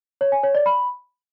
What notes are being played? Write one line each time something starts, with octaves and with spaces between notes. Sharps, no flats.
C#5
G#5
C#5
D5
B5